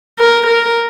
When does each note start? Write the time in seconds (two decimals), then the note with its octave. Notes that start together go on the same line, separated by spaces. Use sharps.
0.19 A#4
0.47 A#4